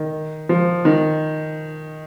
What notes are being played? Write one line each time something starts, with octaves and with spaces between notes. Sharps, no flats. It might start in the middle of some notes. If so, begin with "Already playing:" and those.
Already playing: D#3
F3
D#3